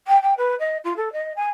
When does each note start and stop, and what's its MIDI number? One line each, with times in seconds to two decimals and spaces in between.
0.07 0.21 79
0.22 0.33 79
0.38 0.55 71
0.59 0.78 75
0.84 0.93 65
0.96 1.12 69
1.13 1.32 75
1.36 1.48 80